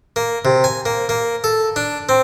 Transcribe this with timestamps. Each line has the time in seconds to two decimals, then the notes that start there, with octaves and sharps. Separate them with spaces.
0.16 A#3
0.45 C3
0.64 G#5
0.86 A#3
1.09 A#3
1.44 A4
1.76 D4
2.09 C4